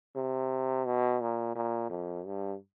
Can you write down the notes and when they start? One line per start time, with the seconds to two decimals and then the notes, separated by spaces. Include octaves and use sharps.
0.16 C3
0.85 B2
1.21 A#2
1.56 A#2
1.90 F2
2.26 G2